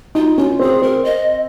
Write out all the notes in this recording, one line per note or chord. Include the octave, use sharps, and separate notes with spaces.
D#4 F4
C#4 F4
C4 G#4
C4 A#4
D#5